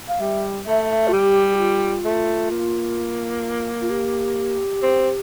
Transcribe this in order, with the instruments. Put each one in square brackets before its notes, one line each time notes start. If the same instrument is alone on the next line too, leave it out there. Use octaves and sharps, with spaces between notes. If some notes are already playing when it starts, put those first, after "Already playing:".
[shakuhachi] F5
[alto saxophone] G3 [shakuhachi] E5
[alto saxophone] A3 [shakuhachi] E5
[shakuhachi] E5
F4
[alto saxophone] G3 [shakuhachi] G4
[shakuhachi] F4
[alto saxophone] A3
A#3
[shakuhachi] F4
G4
[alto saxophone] C4